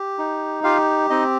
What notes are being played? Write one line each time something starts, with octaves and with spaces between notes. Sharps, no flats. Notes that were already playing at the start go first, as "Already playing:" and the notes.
Already playing: G4
D#4
F4 G4 F5
C4 D#4 D#5